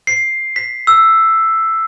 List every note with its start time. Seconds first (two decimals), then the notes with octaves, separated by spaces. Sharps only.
0.07 C7
0.56 B6
0.87 E6